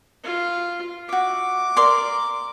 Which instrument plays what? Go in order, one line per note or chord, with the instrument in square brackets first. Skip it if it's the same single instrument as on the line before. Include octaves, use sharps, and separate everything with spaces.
[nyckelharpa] F4
[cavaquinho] F#4 E5 [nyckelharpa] D6
[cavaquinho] A#4 D5 C6